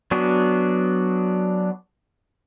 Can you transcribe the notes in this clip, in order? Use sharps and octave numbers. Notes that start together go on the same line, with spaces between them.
F#3 B3 D4 F#4 G#4